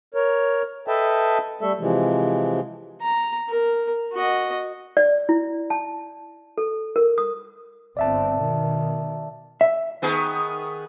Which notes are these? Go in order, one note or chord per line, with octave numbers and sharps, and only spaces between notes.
A#4 C#5
A4 B4 D#5 E5 G5 A5
G3 A3 A4 E5
C3 E3 F3 G#3
A#5
A#4
F#4 D#5
D5
E4
A5
A4
A#4
D#6
G1 C4 D5 E5 A5
B2 D#3
E5
D#3 B3 G#4